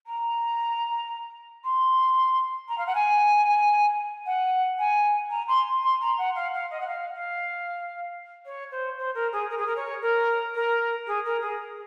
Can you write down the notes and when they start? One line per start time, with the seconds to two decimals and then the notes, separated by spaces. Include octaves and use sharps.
0.06 A#5
1.64 C6
2.68 A#5
2.78 F5
2.87 F#5
2.95 G#5
4.26 F#5
4.79 G#5
5.30 A#5
5.48 C6
5.83 C6
6.01 A#5
6.18 F#5
6.35 F5
6.54 F5
6.71 D#5
6.80 F#5
6.88 F5
7.14 F5
8.46 C#5
8.71 C5
8.98 C5
9.14 A#4
9.32 G#4
9.50 A#4
9.58 G#4
9.66 A#4
9.76 C#5
10.02 A#4
10.54 A#4
11.07 G#4
11.25 A#4
11.41 G#4